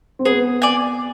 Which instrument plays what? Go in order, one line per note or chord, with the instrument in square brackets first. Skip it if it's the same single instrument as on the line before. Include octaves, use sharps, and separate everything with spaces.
[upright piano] C4
[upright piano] B3 [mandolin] G#4
[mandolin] D5 G#5